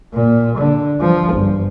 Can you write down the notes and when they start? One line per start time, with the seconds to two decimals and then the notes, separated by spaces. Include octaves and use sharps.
0.14 A#2
0.57 D3
1.00 F3
1.33 G1